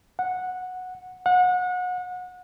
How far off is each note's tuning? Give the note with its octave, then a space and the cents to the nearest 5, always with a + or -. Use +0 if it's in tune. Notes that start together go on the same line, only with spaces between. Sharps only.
F#5 -10
F#5 -30